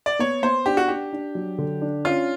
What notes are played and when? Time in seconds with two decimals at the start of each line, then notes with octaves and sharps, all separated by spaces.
0.06 D5
0.19 B3 C#5
0.43 B3 C5
0.66 D4 G4
0.77 F#4
0.88 D4 G4
1.13 D4
1.35 F#3
1.58 D3
1.81 D4
2.05 C#4 F4